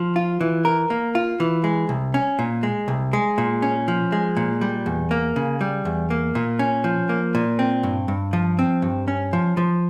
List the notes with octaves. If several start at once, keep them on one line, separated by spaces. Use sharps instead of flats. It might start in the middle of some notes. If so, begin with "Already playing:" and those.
Already playing: F3
F4
E3
A#4
A#3
F4
E3
G#3
C2
C#4
A#2
G#3
C2
G#3
A#2
C#4
F3
G#3
A#2
G3
E2
A#3
C#3
G3
E2
A#3
A#2
C#4
F3
A#3
A#2
C4
G2
G2
F3
C4
G2
C#4
F3
F3